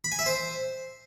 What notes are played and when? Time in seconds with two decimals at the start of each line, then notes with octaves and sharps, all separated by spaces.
0.04 B5
0.12 G#5
0.19 E5
0.26 C5